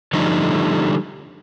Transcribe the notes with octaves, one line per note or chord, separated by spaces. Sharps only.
D3 F3 G3 A3 D#4 C5